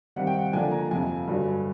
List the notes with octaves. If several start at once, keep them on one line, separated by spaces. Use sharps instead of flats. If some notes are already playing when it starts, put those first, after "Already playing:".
D#3 G3 C4 D#4 F#5
G5
F#5
D3 F3 A#3 D4 G#5
A#5
F2 C3 F3 G#5
G2 D3 F#3